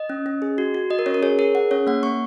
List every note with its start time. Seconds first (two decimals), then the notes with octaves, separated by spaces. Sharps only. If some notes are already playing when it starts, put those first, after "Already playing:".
Already playing: D#5
0.10 C#4
0.26 C#4
0.42 G#4
0.58 F#4
0.74 F#4
0.90 F#4 D#5
0.99 A#4
1.06 C#4 C#5
1.14 A#4
1.23 G#4 C#5
1.39 G#4 A#4
1.55 G#4 F#5
1.71 C#4 C#5
1.87 A#3 F#5
2.03 A#3 C#6